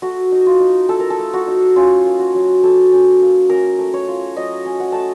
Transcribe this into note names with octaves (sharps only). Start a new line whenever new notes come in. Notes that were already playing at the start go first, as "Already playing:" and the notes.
A3 F#4
D#4
F4
D#4
A3 A4
A#4
A4
A3
F#4
D#4
C#4 F4
A#3
F#4
F#3
F#3 A4
C#4
A#3
C#4 A#4
A3
C#5
F4
F#3 D#5
C#4
F#5
A3 A5